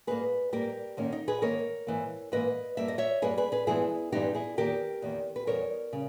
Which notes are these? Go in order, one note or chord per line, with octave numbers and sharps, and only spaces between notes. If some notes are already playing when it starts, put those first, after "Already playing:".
G#2 G3 A#3 G#4 B4
G#2 G3 A#3 G4 A#4
G#2 D#3 A#3 C#4
D#4
G#4 B4
G#2 D#3 A#3 A#4 C#5
G#2 E3 A#3
G#2 E3 A#3 B4 D#5
G2 G3 A#3 E5
D#5
C#5 E5
G2 G3 A#3 G#4 B4
G#4 B4
G#4 B4
G2 E3 G#3 B3 E4 G#4
G2 E3 G#3 B3 D#4 G4
E4 G#4
E2 D#3 A#3 G4 A#4
E2 D#3 A#3
B4
E2 C#3 G3 A#4 C#5
C#3 G3